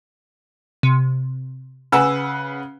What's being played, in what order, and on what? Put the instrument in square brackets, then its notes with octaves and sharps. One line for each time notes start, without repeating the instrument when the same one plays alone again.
[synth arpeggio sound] C3
[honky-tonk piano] C#3 B4 F#5 [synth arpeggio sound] G#5 E6